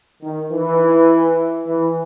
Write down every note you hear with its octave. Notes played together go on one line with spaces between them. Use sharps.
D#3
E3
E3